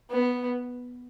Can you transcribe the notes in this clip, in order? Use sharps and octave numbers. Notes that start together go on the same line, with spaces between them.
B3